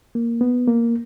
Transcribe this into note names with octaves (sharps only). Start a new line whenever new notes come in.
A#3
B3
A#3